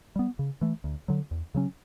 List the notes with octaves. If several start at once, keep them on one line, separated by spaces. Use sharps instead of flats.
G3 B3
C#3
E3 A3
D2
D3 F#3
E2
C#3 F#3 C#4